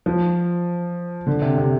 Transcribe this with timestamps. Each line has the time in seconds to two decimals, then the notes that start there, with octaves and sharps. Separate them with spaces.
0.06 F3
1.27 D3
1.42 C3
1.58 C3